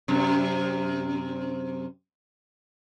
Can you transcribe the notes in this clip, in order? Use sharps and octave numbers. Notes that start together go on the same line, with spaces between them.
F#2 C3